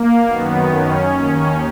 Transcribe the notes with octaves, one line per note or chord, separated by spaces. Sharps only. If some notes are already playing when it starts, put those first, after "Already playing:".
Already playing: A#3
F#2 D#3 B3
C#4
D#2 D#3 C#4